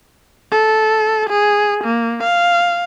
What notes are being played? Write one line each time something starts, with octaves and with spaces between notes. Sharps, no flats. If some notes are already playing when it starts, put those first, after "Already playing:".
A4
G#4
A#3
F5